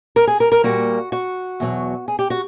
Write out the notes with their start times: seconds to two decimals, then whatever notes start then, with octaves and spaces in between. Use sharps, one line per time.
0.16 A#4
0.27 G#4
0.40 A#4
0.52 A#4
0.64 A#2 G3 A#3 F#4
1.12 F#4
1.60 E2 B2 F#3
2.08 G#4
2.19 G4
2.30 F#4